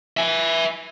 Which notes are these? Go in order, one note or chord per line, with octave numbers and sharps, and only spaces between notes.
E5 G#5